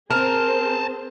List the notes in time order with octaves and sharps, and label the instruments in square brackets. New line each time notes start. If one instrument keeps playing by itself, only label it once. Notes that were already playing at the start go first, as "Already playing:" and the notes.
[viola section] C4 G#4 C5 [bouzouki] A#4 [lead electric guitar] G#5 A5